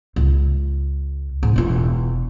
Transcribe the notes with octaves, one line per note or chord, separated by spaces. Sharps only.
C#2
G#2
E1 F4